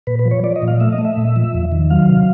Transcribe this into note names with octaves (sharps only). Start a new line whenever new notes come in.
A#2 B4
B4
F3
C#5
F3 D5
D#5
A#2
F5
A3 E5
D#5
A3
E5
A#2
F3
E2
D#3
F#3 F5
C3